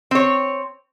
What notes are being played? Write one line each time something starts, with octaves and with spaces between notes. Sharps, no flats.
C4 C#5